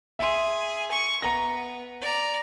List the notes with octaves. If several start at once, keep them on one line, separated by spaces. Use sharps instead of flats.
G#4 E5 C6
C#6
B3 A#5 A#6
D5 A#5